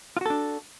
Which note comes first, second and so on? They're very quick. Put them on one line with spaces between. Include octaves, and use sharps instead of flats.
F4 F#4 A4 D4